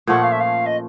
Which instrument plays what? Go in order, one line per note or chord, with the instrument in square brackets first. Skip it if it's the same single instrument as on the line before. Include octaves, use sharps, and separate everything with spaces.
[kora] A#2 F3 A3 C#4 [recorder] F#5
[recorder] F5
E5
F5
D#5